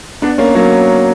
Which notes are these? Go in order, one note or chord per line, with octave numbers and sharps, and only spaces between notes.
B3 D4
A#3 C#4
F#3 A#3